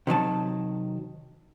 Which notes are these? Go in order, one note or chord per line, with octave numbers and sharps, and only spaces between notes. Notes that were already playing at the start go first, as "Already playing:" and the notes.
C3 D#3 F#3 A5